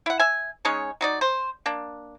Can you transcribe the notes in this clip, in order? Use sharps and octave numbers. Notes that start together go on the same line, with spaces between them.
E4 F#5
E5 G#5
G#3 C#4 D#4 C#5
F#3 D#4 D5
C5
A#3 D4